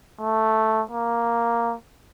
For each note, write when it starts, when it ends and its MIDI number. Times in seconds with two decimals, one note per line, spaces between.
0.20 0.82 57
0.91 1.74 58